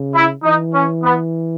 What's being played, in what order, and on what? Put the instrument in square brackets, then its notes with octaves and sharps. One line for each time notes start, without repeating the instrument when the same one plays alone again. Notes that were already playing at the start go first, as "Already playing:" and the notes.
Already playing: [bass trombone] C#3
[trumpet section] E4
[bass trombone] E3 [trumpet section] D#4
[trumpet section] C#4
B3